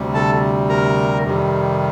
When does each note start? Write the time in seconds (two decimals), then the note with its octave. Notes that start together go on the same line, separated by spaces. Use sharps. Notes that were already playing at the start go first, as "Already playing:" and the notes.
Already playing: D2 C3 G3
0.14 A4 A5
0.69 A#4 A#5
1.24 F2 C3 D#3 G3